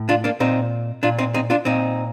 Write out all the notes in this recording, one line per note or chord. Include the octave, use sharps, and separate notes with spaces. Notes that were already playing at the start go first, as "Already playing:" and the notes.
Already playing: A2
D4 F4
A#3 D4
A#2 C4 D#4
A#2 D4 F4
C4 D#4
C4 D#4
D4 F4
A#2 C4 D#4